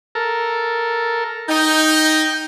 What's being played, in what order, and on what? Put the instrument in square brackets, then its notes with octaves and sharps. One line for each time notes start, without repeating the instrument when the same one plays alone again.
[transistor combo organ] A4 A#4
[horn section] D#4 [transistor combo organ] G5